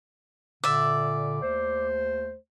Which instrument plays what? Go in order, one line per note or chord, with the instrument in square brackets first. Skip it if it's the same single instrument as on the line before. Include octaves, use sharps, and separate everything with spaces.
[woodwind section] A#2 D3 [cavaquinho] D5 E5
[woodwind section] D#2 A3 C5